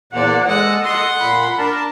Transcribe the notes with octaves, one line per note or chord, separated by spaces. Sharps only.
E2 A#2 A#3 C5 D5 F#5
G#3 A4 D#5 F#5
F#5 C6 D#6
A#2 B5
D4 A#4 A5